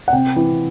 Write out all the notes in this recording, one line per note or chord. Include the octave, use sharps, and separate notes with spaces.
F#5
C3 G5
E3